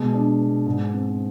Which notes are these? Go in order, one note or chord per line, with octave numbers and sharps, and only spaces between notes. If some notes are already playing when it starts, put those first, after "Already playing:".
Already playing: B2 G#3
D4
B3
G#2
C4